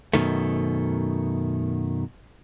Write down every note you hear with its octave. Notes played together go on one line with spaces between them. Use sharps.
F#2 B2 D#3 A3